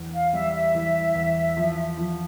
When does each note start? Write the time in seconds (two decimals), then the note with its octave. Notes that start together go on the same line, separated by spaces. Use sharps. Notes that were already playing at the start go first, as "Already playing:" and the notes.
Already playing: E2
0.13 F5
0.33 G3 E5
0.54 E5
0.75 E3
1.15 E2
1.57 F3
1.98 F3